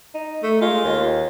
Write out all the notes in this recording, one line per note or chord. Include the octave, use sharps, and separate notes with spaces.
D#4
A3
G#3 F4
D#2